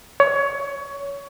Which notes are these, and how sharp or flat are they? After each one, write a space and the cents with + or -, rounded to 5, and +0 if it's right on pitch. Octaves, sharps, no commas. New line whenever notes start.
C#5 +20